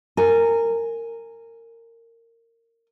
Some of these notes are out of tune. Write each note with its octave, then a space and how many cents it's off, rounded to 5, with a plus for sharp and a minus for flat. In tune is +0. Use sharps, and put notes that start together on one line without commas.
A#4 -20 G#5 +0